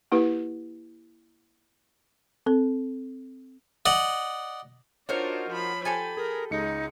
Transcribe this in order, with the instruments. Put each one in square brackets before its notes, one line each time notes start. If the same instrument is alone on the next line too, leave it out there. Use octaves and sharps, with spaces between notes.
[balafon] A#3 E4 G4 B4
C4 A4
[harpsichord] D5 D#5 F#5
[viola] D4 F4 [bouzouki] D#4 F#4 A#4 [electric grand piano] C5 C#5
[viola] F3 B5
[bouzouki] G4 A4 G#5 [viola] B5
[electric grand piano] G#4 [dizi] A#4
[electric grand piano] C#2 C#7 [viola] G#3 [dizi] D#4